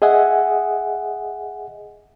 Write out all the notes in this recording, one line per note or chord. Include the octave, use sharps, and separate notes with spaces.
G#4 D#5 E5 F#5 G#5